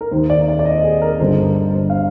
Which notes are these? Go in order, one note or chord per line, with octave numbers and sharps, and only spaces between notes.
A#4
D#2 D#3 C5
D5
D5
D5
D#5
G#4
A#4
G1 G2 D3 C5
C5
F5